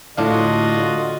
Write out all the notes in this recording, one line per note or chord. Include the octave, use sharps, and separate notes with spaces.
A2 D3 D4 F4 F#4 D#5 F5